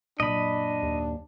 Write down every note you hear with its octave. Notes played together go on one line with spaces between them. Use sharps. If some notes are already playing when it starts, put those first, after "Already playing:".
F#2 A#2 D4 D#5 B5
D#2